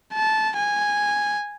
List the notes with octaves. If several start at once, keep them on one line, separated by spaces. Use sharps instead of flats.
A5
G#5